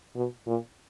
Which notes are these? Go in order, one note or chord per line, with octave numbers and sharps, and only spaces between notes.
B2
A#2